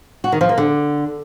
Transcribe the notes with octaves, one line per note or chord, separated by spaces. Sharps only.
F#4
D#3
F3
A#3
D3